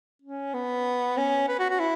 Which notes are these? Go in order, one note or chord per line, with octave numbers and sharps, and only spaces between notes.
C#4
B3
C#4
B4
F#4
F#4
E4